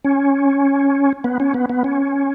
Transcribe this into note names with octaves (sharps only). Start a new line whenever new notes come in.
C#4
B3
C#4
B3
B3
C#4